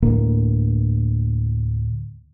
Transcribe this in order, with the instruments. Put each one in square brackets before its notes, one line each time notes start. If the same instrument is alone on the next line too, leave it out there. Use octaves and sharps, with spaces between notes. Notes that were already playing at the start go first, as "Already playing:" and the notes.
[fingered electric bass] D2 A2 A#3